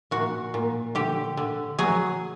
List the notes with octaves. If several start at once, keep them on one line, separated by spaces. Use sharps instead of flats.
A#2 F#4
A#2
D3 G4
D3
F#3 G#4